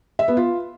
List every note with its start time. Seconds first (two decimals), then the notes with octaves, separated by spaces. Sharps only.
0.19 E5
0.28 B3
0.37 F4